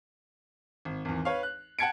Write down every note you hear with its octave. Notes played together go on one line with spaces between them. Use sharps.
G#1
G#1 E2
B4 C#5 F5
F#6
F#5 G5 A5 G#6 C#7 D7